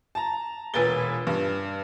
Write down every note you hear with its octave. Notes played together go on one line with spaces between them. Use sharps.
A5 A#5
E1 A#2 B4 G#5 A6 G7
G2